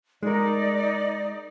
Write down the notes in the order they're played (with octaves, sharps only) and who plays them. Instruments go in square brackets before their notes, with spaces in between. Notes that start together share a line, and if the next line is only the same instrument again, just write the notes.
[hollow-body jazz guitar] G#3 A#4 [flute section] D#4 D5